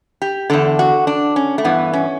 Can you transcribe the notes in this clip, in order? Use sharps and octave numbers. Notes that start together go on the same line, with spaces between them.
G4
E2 D3 A4
F#4
D4
C#4
A3
G2 E3 B3
C#4